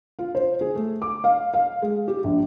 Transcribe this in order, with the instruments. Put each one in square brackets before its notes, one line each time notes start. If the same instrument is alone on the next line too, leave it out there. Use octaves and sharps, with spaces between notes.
[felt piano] F4
C5
G#4
A3
D6
F5
F5
G#3
G4
A#1